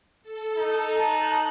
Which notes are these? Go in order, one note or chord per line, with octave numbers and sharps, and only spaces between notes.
A4
D#4
A5 F#6